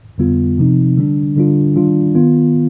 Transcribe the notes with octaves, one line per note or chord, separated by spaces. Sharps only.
F2 D3 G3 B3 F4
C3 F3 C4 D#4
D3 G3 D4
D3 G3 D4 F4
D#3 G3 D4 F4
D#3 B3 F4